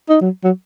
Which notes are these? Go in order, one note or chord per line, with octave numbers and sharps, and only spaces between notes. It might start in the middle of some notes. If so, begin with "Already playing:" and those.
D#4
F#3
F#3